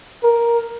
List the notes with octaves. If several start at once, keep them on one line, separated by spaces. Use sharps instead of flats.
A#4